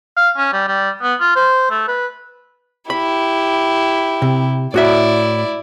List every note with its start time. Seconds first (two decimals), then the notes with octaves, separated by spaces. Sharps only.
0.17 F5
0.37 C#4
0.53 G3
0.68 G3
1.02 B3
1.20 F4
1.36 C5
1.71 A3
1.88 B4
2.90 E4 G4 B5
4.22 C3
4.74 A2 E4 F#4 D5 E5